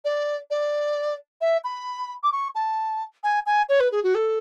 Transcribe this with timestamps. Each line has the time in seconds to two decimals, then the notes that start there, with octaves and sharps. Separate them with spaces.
0.05 D5
0.50 D5
1.41 E5
1.64 B5
2.23 D6
2.32 C#6
2.55 A5
3.23 G#5
3.46 G#5
3.69 C#5
3.80 B4
3.92 G#4
4.03 F#4
4.15 A4